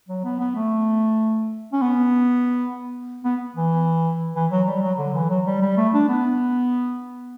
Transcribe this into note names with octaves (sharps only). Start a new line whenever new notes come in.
F#3
B3
B3
A3
C#4
B3
B3
E3
E3
F#3
G3
F#3
D3
E3
F#3
G3
G3
A3
D4
B3